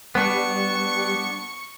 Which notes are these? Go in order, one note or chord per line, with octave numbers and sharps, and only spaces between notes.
G3 B3 D4 C#6